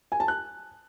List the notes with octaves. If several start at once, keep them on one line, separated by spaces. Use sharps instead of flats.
G#5
A5
F#6